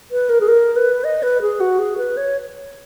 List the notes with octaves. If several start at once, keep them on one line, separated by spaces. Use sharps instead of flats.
B4
A#4
G#4
A#4
B4
D#5
B4
G#4
F#4
G#4
B4
C#5